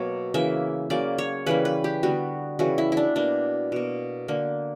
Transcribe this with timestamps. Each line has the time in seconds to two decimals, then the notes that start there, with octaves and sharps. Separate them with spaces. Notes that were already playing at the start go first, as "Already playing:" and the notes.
Already playing: B2 F#3 A#3 C#5
0.34 C#3 E3 A#3 E5
0.90 C#3 F#3 A#3 D5
1.18 C#5
1.46 C#3 E3 G3 A#3 B4
1.65 B4
1.84 G4
2.03 D3 G3 B3 F#4
2.59 C#3 E3 G3 F#4
2.78 E4
2.92 D4 E4
3.15 B2 A#3 D4
3.72 B2 A#3
4.28 D3 A#3